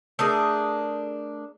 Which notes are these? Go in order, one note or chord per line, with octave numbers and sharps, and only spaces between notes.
A3 D4 G#4 A#4